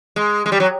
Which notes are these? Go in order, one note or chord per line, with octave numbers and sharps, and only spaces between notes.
G#3
G#3
G3
F#3